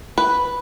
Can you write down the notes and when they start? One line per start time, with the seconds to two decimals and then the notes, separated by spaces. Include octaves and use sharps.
0.18 B4